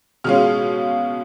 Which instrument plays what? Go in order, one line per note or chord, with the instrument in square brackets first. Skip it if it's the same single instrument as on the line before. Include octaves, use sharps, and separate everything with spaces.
[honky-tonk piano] B2 G#3 C#4 F4 F6